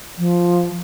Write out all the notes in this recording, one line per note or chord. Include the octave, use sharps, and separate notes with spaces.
F3